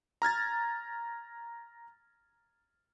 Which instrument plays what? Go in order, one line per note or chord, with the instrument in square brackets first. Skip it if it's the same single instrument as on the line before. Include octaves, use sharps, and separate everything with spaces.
[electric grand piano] A#5 F6 G#6 A6